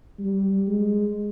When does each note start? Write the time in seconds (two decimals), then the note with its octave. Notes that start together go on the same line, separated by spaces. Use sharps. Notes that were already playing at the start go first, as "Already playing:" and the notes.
0.19 G3
0.67 G#3